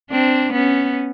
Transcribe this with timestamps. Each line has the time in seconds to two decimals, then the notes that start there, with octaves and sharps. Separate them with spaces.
0.11 C4 D4
0.52 B3 C#4